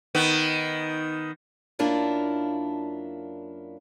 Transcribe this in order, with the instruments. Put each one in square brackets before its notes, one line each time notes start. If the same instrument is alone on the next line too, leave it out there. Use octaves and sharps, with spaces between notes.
[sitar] D#3 B3
[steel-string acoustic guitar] F#2 A#3 D4 E4 F4 A#4